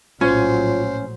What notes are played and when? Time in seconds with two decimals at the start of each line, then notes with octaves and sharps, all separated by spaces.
0.21 A#1 A2 F#3 C#4 F4 C5